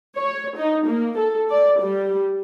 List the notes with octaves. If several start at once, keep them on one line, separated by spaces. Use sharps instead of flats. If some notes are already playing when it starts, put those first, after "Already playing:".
C#5
D#4
A#3
A4
D5
G3